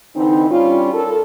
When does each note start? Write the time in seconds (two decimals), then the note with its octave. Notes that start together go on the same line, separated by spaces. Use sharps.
0.16 D3 E3 C4 D#4
0.50 G2 G3 C#4 F4
0.93 A4 A#4